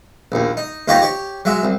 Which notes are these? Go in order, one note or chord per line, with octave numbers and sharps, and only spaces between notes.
A#1 D#2
D#4
D#2 D#4 F4 G4 C#5 A#5
G4 C#5
F#3 G#3 E5
C2